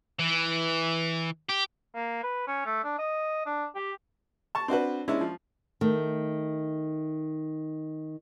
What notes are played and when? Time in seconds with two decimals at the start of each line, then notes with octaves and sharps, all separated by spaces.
0.19 E3
1.49 G4
1.95 A#3
2.23 B4
2.48 C#4
2.66 A3
2.84 D4
2.99 D#5
3.46 D4
3.75 G4
4.55 A5 C#6
4.68 C4 D4 F#4 B4
5.08 G#3 C#4 D4 E4
5.21 F3
5.81 D#3 A3